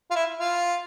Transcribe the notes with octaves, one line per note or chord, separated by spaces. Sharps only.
F4
E4
F4